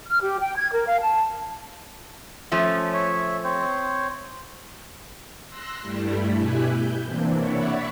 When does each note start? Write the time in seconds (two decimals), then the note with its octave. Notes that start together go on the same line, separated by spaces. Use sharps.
0.07 F6
0.21 G4
0.40 G5
0.57 G#6
0.72 A#4
0.86 F5
1.00 A5
2.52 F3 A3 C#4
2.94 C#5 E5
3.44 C4 C5 C#5
5.48 C6 E6 F#6 A#6
5.81 G2 G3 A3 E4
6.35 B2 E4 G4 E5 G#5 F#6
6.65 G6
7.04 C3 E3 A#3 C4 D4
7.37 C#5 D5 E5 F#5 B5 C#6